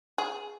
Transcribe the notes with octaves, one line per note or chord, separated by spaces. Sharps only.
G#4